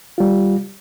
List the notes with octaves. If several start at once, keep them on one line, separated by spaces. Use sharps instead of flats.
G3 F4